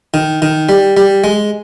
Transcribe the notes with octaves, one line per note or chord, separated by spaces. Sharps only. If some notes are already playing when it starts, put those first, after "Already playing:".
D#3
D#3
G3
G3
G#3